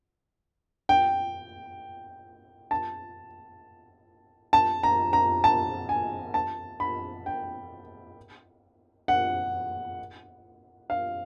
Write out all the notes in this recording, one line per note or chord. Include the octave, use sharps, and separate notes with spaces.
G5
A5
A5
A#5
A#5
A5
G#5
A5
B5
G5
F#5
F5